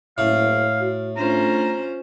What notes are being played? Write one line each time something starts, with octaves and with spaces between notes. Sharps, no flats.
F#1 A2 F5
F#4
A3 C#4 D4 F4 C5 A#5